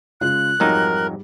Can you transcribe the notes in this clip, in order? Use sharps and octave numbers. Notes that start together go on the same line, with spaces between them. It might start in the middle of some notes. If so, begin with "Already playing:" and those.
C#3 G#3 F4 F#6
F2 G#2 F#3 G3 D#4 A#4